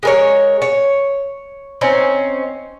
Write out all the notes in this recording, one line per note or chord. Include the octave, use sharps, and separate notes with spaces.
G#3 A#4 C#5
C#5
C4 C#4 D#4